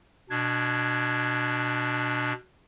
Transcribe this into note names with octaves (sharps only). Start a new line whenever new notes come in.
B2 D4 G#6